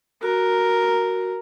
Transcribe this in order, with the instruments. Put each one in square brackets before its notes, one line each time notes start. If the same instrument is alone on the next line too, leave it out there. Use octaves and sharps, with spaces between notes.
[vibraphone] F#4 [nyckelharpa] A#4